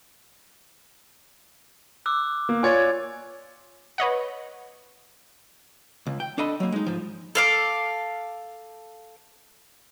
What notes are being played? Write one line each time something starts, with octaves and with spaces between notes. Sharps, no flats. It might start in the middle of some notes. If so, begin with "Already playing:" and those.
D6 E6 F#6
A#3
F4 C#5 D5 G#5 G#6 A6
B4 C#5 D#5 F#5
C#2
G5
D4 A4 D#5 B5 C6
F#3 A#3
G#3 D#4
G#2 F3
A4 F5 D6